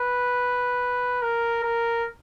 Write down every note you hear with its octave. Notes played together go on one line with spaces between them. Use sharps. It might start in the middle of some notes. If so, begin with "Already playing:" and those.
Already playing: B4
A#4
A#4